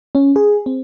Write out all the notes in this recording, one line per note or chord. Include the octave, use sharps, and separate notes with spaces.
C#4
G#4
C4